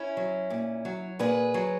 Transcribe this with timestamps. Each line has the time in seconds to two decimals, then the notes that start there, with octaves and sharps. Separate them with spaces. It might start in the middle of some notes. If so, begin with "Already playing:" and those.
Already playing: C#4 E4
0.17 F#3
0.50 A#2
0.85 F#3
1.19 A#2 G#4 B4
1.54 F#3